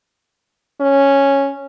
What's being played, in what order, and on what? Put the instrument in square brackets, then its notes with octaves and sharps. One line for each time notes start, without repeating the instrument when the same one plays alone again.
[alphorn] C#4